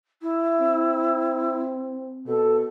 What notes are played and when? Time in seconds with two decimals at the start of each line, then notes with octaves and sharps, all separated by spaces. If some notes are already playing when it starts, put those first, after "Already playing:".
0.22 E4
0.61 C4
2.27 B2 A4